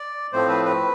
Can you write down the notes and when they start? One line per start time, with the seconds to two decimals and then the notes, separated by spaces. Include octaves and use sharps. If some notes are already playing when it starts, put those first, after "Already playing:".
Already playing: D5
0.33 A2 F3 A3 C4 C5
0.49 B4
0.65 B4